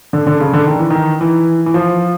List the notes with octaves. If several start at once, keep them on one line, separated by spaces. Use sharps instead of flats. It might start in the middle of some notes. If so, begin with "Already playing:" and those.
D3
D3
C#3
D3
D#3
E3
D#3
E3
E3
F3